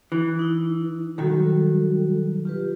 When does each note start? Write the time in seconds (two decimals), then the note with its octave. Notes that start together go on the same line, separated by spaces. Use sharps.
0.12 E3
0.39 D#4 E4
1.18 B1 D#3 G3 F#4 A4
2.45 F4 G4 B4